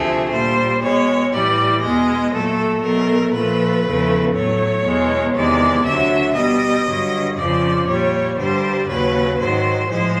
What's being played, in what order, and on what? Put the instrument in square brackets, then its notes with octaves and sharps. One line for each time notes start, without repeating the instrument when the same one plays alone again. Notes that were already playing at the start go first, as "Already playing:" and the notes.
Already playing: [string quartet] D2 C3 F3 A3 G#4
A#2 G3 C5
B2 G#3 C#5
A2 E3 G3 D5
E2 B2 G#3 D#5
A#2 F#3 A3 A4
B2 F#3 A3 A#4
A#2 F3 A3 B4
E2 C#3 F3 A3
A2 F#3 A3 C#5
E2 B2 G#3
E2 C3 D#3 G#3 D5
D2 D3 F#3 E5
B2 G3 D#5
G2 D3 F#3
F2 C#3 F3 D5
A#2 G3 C#5
G2 D3 G3 C5
D#2 C#3 F#3 B4
G#2 D#3 F#3 C5
A2 F3 G#3 C5